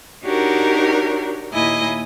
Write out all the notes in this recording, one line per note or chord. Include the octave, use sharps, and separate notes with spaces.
D4 D#4 F#4 G4 A#4 C#5
D#2 A#2 A#3 E4 D#5 G#5